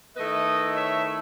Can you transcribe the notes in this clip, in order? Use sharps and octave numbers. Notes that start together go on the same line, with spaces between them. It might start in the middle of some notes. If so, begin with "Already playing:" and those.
D#3 A3 E4 B4 D#5
C#5 E5